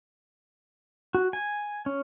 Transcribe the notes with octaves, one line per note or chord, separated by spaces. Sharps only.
F#4
G#5
C#4